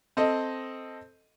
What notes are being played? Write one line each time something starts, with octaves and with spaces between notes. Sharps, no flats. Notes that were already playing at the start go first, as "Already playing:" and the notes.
C4 A4 D#5